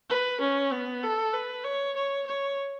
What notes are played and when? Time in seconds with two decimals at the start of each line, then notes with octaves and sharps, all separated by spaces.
0.10 B4
0.40 C#4
0.72 B3
1.03 A4
1.33 B4
1.64 C#5
1.96 C#5
2.26 C#5